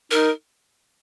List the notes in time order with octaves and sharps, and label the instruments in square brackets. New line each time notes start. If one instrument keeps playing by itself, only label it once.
[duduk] D#4 [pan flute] A#4